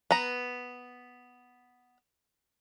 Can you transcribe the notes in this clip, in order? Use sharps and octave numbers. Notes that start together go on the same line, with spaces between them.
B3 A#5